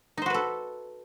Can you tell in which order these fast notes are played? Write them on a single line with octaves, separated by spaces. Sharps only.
D#4 C5 F#4 B4 A4